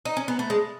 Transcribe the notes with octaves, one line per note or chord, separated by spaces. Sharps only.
D#4
C#4
B3
A3
G#3